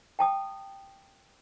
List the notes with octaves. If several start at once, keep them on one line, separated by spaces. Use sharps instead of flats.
G5 A5 D#6